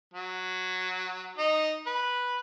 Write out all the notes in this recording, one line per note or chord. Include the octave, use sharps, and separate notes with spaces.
F#3
D#4 D#5
B4